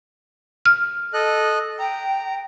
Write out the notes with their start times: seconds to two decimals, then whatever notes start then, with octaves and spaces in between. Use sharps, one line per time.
0.66 F6
1.14 A4 D#5 F#6
1.80 G5 A#5